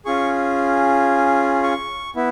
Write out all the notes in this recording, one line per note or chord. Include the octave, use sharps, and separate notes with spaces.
C#4 F4 G#4 C#6
C#6
B3 E4